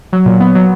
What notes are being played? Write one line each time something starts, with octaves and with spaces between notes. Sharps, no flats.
F#3
A#2
B3
F#3